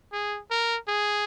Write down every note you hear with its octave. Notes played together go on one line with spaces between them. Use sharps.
G#4
A#4
G#4